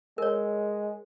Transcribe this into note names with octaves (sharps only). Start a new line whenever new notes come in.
G#3 A#4 C#5